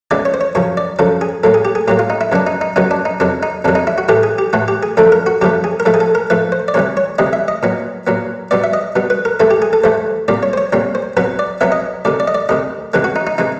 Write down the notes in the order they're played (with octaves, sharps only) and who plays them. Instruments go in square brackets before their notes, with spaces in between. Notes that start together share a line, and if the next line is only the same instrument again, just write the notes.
[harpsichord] C#2 C#3 E3 G#3 B3 D5
C#5
C5
C#5
F#2 C#3 F3 C#5
D5
F#2 C#3 F3 A4
G#4
A2 F#3 A#3 A4
G#4
G4
G#4
A2 F#3 A#3 G4
F4
D#4
E4
F#2 C#3 F#3 B3 D4
D#4
D#4
F#2 C#3 F#3 B3 D#4
D4
D#4
F2 C3 D#3 F#3 D4
D#4
F2 C3 D#3 F#3 D4
D#4
E4
F#4
A2 E3 A3 G4
G#4
G4
A2 E3 A3 F#4
G4
G#4
F#2 D3 F3 A3 A4
A#4
F#4
F#2 D3 F3 A3 G4
G#4
A#4
G#2 F3 A3 A4
G#4
A4
A#4
G#2 F3 A3 B4
C5
D5
D2 C3 E3 G3 C#5
C#5
D2 C3 E3 G3 D#5
E5
D#5
A#2 F#3 B3
A#2 F#3 B3
B2 G3 B3 D5
E5
D#5
B2 G3 B3
B4
A#4
G2 E3 A3 A4
G4
G#4
A4
G2 E3 A3 C5
C2 A#2 G3 D5
C#5
C5
C#5
C2 A#2 G3 C#5
C5
C2 B2 F#3 B3 B4
D5
C2 B2 F#3 B3 E5
D#5
D2 C3 D#3 D5
D5
D#5
D5
D2 C3 D#3 D#5
C#2 C3 E3 G#3 B4
F#4
D#4
D#4
C3 E3 G#3 D#4